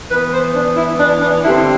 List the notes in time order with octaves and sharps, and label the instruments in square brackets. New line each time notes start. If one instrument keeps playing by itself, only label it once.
[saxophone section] E3 B3 B4
C5
D4
E4
D4
D4
D3 G3 C4 E4